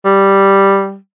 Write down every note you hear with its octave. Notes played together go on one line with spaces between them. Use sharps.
G3